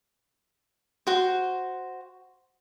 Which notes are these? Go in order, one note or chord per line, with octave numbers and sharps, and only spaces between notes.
F#4 C5